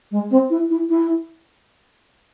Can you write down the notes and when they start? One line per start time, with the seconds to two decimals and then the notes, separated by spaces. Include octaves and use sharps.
0.11 G#3
0.30 C4
0.50 E4
0.69 E4
0.89 E4